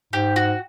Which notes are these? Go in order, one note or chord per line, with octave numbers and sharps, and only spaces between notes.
G#2 G4
F#4